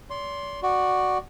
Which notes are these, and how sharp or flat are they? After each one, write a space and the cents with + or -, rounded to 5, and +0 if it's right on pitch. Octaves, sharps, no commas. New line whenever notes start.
D5 -45 C6 +5
F#4 +0 D5 +10